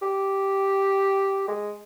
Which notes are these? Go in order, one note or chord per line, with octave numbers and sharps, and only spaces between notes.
G4
G#3